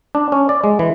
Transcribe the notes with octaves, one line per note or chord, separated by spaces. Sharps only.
D4
C#4
D5
G#3
E3